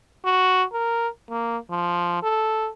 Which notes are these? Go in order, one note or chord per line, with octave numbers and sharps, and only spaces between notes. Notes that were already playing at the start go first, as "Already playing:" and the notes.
F#4
A#4
A#3
F3
A4